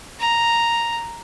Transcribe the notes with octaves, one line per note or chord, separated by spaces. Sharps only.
A#5